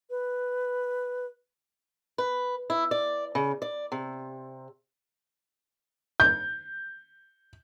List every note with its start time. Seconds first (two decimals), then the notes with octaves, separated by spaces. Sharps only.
0.10 B4
2.18 B4
2.70 E4
2.91 D5
3.35 C#3
3.62 D5
3.92 C3
6.20 G6